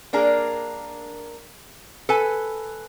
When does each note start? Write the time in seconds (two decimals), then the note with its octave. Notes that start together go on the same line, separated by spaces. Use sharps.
0.13 A#3 D4 G#4 A#4
2.09 A4 B4 G#5